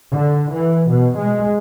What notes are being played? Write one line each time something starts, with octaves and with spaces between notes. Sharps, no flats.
D3
E3
B2
G#3